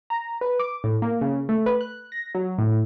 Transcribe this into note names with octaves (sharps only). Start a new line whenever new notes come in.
A#5
B4
D6
A2
A#3
C#3
A3
B4
F#6
A#6
F#3
A2